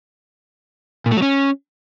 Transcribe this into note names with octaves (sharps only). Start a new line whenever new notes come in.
A#2
A3
F#3
C#4